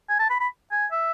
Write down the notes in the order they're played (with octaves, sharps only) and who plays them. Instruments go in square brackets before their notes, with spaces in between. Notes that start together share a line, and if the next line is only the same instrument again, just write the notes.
[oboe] G#5
A5
B5
B5
G#5
E5